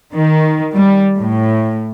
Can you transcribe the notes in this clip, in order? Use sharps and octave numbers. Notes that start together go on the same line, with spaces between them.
D#3
G3
A2